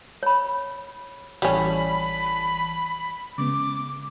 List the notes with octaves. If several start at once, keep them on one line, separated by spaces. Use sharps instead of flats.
C#5 B5
A1 E3 G3 C#4 A5 B5
C#3 G#3 B3 D6